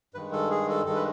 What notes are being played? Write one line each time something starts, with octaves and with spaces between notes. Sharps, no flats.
G2 D#3 G#3 B4
A4
G#4
A4
G2 D#3 G#3 A4
B4